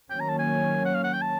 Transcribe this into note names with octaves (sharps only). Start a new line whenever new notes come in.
D#3 F#3 A#3 C#4 G5
A#5
A5
G#5
F#5
F5
F#5
G5
A5